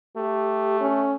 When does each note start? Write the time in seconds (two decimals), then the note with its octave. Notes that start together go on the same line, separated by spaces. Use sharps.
0.17 A3 G4
0.81 C#4